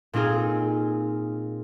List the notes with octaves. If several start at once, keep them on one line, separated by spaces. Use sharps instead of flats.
A#2 C4 D#4 F4 G#4